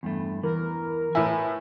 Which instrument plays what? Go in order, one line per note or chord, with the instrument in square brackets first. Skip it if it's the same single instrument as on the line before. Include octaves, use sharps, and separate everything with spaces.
[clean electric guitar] E2 G2 A3
[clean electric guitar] E2 G#2 E3 [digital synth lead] A#4
[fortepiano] A2 E4 [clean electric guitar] B4 G#5